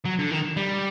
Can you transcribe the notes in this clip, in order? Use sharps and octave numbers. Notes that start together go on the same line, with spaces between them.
F#3
D3
D#3
G3